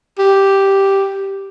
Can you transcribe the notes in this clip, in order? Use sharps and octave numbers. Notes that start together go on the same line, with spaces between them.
G4